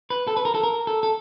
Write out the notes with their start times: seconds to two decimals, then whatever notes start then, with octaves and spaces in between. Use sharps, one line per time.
0.10 B4
0.27 A4
0.37 B4
0.45 A#4
0.55 A4
0.63 A#4
0.87 A4
1.03 A4